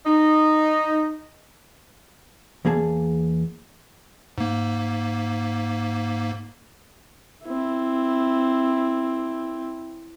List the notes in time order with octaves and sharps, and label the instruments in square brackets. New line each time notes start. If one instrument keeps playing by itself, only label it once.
[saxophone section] D#4
[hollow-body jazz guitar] E2 A#3 G#4 A5
[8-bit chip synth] G#2 A#3
[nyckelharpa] C4 E4